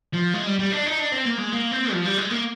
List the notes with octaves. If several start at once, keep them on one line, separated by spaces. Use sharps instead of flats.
F3
G#3
G3
G3
D4
D#4
D4
C4
A#3
G#3
A#3
C4
F3
G3
G#3
A#3